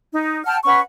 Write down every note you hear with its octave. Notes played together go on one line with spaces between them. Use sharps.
D#4
F#5 G5 A5 F6
C#4 B4 F#5 C#6